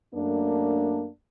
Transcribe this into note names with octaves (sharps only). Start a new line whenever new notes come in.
F#2 A3 A#3 D4